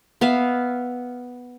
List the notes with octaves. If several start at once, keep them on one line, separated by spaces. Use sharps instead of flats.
B3 E5 F5